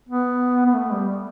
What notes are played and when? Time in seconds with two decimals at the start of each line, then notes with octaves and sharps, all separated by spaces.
0.09 B3
0.66 B3
0.75 A3
0.92 G3